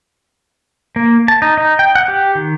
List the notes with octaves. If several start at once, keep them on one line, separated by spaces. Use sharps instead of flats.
A#3
A5
D#4
D#4
G5
F#5
G4
D#3